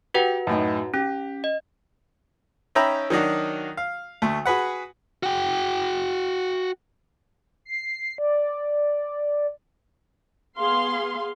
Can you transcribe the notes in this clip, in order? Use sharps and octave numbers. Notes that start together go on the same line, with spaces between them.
F#4 G4 B4 F#5
F#2 A2 D#4
C#4 G4
D#5
C#4 D#4 E5 G5 A#5 B5
D#3 F#3 D4 D#4 F#4
F5
D2 A3
F#4 G#4 B4 F#5
F#4 G5
C7
D5
B3 G#4 F5 C6